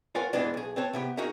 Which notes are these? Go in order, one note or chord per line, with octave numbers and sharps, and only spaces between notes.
F4 A#4 B4 C#5 F#5 G#5
F2 B2 E3 G#3 B3 D4
B1 G#4
C4 B4 C#5 A5
C3 B3 G4
D#4 F#4 G#4 A#4 E5